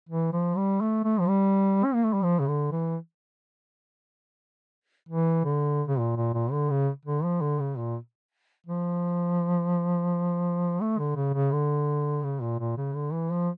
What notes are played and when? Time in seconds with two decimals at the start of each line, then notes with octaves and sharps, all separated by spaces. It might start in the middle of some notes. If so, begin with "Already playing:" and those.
0.09 E3
0.33 F3
0.57 G3
0.81 A3
1.04 A3
1.20 F3
1.28 G3
1.85 C#4
1.94 A#3
2.04 A3
2.13 G3
2.23 F3
2.40 C#3
2.47 D3
2.72 E3
5.09 E3
5.45 D3
5.88 C#3
5.99 A#2
6.17 A#2
6.34 A#2
6.52 D3
6.70 C#3
7.06 D3
7.24 F3
7.42 D3
7.60 C#3
7.77 A#2
8.67 F3
10.81 A3
10.99 D3
11.16 C#3
11.34 C#3
11.52 D3
12.23 C#3
12.42 A#2
12.60 A#2
12.77 C#3
12.95 D3
13.12 E3
13.31 F3